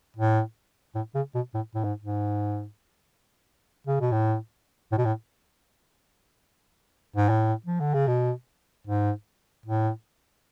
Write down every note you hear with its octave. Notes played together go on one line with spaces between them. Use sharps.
A2
A2
C#3
B2
A2
A2
G#2
G#2
C#3
B2
A2
A2
B2
A2
G#2
A2
F3
D3
C#3
B2
G#2
A2